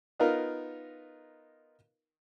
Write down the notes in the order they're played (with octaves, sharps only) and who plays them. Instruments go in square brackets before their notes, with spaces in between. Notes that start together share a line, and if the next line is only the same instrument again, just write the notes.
[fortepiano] B3 D#4 F4 A#4